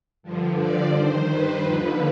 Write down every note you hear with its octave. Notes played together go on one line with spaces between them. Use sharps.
G2 D3 F3
D5
G2 D#3 C5
B4
D#2 D3 F3